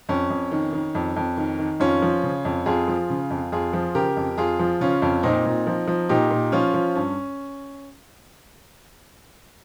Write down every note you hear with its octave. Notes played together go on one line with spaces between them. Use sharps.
F2 C#4
F2
D#3
D#3
F2
F2
D#3
D#3
F2 C#4 F4
F3
C#3
F2
F2 F4 G#4
F3
C#3
F2
F2 F4 G#4
F3
C#3 G4 A#4
F2
F2 F4 G#4
F3
C#3 C#4 F4
F2
A#2 C4 D#4
A#2
F3
F3
A#2 D#4 G4
A#2
F3 C#4 F4
F3
G2 C#4